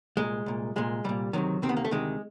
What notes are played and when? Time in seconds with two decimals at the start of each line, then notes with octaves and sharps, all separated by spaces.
0.17 C2 A#2 G#3
0.46 C2 A#2
0.76 C2 A#2 G#3
1.04 C2 A#2 G3
1.33 D2 C3 D#3 F#3
1.62 D2 C3 D#3 C4
1.69 B3
1.77 A#3
1.85 A3
1.91 D2 C3 D#3 G#3